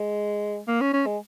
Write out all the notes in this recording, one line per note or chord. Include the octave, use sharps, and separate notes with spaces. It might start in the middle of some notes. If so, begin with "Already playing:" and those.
Already playing: G#3
A#3
C#4
C#4
G#3